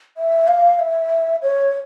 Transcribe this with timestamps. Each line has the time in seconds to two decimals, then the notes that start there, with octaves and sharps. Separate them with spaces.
0.17 E5
0.48 F5
0.79 E5
1.43 C#5